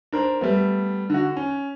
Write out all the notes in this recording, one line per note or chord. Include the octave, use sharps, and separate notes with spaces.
D4 A#4 C5
G3 A3 B3
D3 F#4
C#4